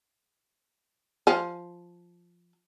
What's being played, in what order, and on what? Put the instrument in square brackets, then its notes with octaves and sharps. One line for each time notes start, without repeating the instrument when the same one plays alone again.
[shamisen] F3 G#5